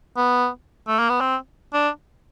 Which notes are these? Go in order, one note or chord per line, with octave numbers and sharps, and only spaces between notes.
B3
A3
A#3
B3
C4
D4